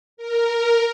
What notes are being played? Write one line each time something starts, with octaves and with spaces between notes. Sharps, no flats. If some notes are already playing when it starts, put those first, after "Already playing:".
A#4